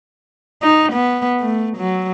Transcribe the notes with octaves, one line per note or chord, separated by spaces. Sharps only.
D#4
B3
A3
F#3